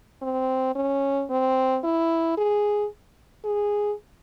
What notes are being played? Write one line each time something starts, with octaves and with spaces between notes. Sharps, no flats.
C4
C#4
C4
E4
G#4
G#4